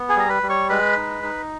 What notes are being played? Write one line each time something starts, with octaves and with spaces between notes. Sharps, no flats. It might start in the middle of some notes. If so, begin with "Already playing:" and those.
Already playing: B3
G#4 G#5
G3 A#5
B4 B5
G3
C#5 C#6
G#3 B4 B5
D#4
D#4